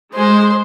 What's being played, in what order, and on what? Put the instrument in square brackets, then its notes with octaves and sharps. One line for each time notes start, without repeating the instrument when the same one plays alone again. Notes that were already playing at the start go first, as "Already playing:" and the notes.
[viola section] G#3 [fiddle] C5